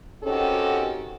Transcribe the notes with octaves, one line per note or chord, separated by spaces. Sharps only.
D#3 C4 C#4 F#4 G4 A4